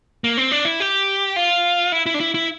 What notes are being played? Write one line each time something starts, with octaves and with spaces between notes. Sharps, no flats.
A#3
C4
D4
E4
G4
F4
E4
E4
D4
E4
E4